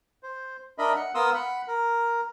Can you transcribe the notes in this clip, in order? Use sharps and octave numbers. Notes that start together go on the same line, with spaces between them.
C5
D4 A#4 D#5 E5 B5
F#5
B3 A#4 F5 C6 D#6 E6
F#5 B5
A#4